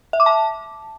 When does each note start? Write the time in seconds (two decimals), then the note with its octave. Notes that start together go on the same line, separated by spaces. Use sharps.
0.13 E5
0.20 D6
0.26 A5